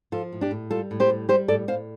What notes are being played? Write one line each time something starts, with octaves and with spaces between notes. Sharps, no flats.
F3 F4 A4
A2
D4 G4
A2
G3 F4 A4
A2
G4 C5
G3
G3 G4 C5
A2 A4 D5
A2 C5 F5